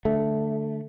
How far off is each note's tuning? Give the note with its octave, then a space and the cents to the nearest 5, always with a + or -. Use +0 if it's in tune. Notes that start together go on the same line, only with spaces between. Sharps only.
D3 +0 A3 +0